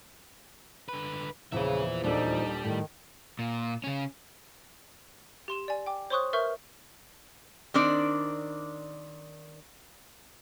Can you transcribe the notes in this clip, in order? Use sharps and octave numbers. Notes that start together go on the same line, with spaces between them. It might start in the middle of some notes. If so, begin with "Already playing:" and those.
D3 B4
E2 A#2 C#3 F3 B4 E5
D#1 G3 D4 D#4 A4
A2 D#3
A#2
C#3 C#4
G4 C6 E7
D5 G#5
G5 D6
C5 C#5 C6 C#6 D#6 F#6
A#4 B4 E5 C#6 F6 G6
D#3 C4 D4 D5